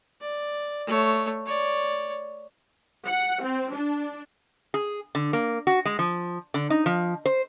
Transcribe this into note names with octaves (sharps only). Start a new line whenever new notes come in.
D5
A3 C#5
C#5 D5
F#5
C4
D4
G#4
D3
A#3
F#4
G#3
F3
D3
D#4
F3
C5